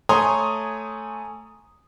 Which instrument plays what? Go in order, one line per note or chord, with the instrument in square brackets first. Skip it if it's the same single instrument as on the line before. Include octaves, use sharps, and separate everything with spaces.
[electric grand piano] A3 C#5 G#5 A#5 C6 D#6